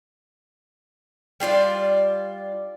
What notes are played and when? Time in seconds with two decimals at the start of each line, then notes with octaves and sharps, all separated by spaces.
1.40 G3 D4 F4 D5